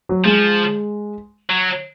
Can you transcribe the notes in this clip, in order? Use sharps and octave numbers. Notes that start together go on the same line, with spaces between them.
F#3
F3 G#3
F#3